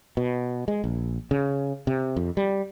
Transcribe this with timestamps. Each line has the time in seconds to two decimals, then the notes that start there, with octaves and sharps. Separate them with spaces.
0.17 B2
0.68 G#3
0.84 A#1
1.31 C#3
1.87 C3
2.16 F2
2.37 G3